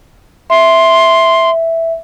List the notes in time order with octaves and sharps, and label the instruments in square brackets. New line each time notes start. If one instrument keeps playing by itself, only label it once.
[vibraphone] E5 [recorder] C6